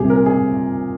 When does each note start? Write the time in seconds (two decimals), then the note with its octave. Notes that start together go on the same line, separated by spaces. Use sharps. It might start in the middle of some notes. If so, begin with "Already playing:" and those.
Already playing: C2 A#2 G3 G4 G#4
0.10 A#4
0.26 G#4